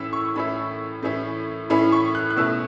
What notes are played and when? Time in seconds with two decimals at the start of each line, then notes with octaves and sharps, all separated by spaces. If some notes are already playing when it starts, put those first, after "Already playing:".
Already playing: A2 E3 C#4 E4 E6
0.13 C#6
0.36 A2 E3 C#4 E4 B5
1.02 A2 E3 C#4 E4
1.70 A2 E3 C#4 E4 B5
1.92 C#6
2.15 F#6
2.30 F#6
2.36 B2 A3 C#4 E4 E6